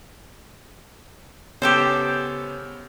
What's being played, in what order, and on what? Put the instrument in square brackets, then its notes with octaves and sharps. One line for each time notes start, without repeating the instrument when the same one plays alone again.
[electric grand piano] C#3 B3 C#5 [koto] G4 A4 C5